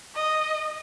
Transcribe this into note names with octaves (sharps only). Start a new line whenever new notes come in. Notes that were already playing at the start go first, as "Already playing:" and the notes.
D#5